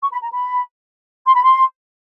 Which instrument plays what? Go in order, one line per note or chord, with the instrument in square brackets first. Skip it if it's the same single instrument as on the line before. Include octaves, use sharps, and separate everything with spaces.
[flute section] C#6
B5
A#5
B5
C6
B5
C6